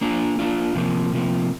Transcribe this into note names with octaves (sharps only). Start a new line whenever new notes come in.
A#3 D4 F4
A#3 D4 F4
C3 F3 A#3
C3 F3 A#3